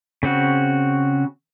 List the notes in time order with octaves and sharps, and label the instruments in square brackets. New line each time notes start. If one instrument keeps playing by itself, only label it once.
[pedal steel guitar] C#3 C4 F#4